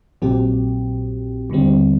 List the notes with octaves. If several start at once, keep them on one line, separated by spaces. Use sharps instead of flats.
A#1 A#2 F#3 C4 G4
D#2 D3 G3 C4